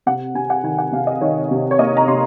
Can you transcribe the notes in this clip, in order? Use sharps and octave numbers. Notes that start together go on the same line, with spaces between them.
C3 F#5
C3 G#5
F#5
D#3 G#5
F#5
C3 F5
D#5
D#3 C#5
C3
C#5
A#3 D#5
A#5
C3 C6